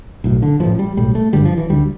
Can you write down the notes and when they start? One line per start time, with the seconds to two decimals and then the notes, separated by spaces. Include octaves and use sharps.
0.24 B1 A2
0.42 D3
0.60 A1 A2 F3
0.79 G3
0.97 B1 A2 G3
1.15 A3
1.33 G1 G2 D3 G3
1.45 F3
1.57 E3
1.70 D2 D3 G3